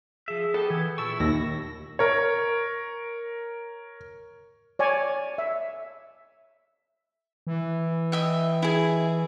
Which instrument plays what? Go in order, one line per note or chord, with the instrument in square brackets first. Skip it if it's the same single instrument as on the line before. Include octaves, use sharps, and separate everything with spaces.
[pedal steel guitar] F3 E5 [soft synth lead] G#4
[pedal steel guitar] B3 G4 [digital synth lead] A4
[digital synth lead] E3 [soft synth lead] G#6
[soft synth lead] A#2 [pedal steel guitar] E4 A5 C#6 [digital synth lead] E6
[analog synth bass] D#2 [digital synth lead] A#6
[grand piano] A#4 C#5
[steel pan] C#5 D5 G#5
E5
[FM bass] E3
[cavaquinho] D#5 E5 G5
E4 G#4